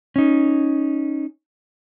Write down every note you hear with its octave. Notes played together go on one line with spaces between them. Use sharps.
C#4 D#4